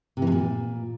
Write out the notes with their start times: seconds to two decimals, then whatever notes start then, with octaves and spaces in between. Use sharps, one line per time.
0.17 C3
0.22 E3
0.27 C3
0.32 A#2